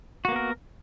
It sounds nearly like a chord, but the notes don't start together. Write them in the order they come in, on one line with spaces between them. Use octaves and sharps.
F#4 A#3 B3 A#4